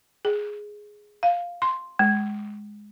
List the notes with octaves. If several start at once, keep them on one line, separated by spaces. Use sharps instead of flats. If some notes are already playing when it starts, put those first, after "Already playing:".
G#4
F5
C6
G#3